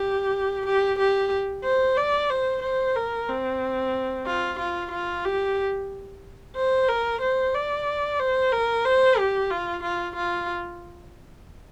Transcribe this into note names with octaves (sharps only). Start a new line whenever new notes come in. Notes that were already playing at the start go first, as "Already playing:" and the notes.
Already playing: G4
G4
G4
C5
D5
C5
C5
A#4
C4
F4
F4
F4
G4
C5
A#4
C5
D5
C5
A#4
C5
G4
F4
F4
F4